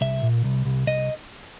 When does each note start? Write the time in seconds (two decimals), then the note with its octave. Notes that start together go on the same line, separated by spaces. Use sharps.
0.01 C2 E5
0.23 A#2
0.44 C2
0.65 C2
0.87 C2 D#5